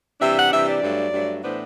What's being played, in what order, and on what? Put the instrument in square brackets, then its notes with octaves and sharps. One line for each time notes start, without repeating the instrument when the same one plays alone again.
[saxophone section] C3 E3 G3 D4 E5
F#5
C3 E3 G3 D4 E5
D5
G2 F#3 A3
G2 F#3 A3
A2 E3 B3 D4 C5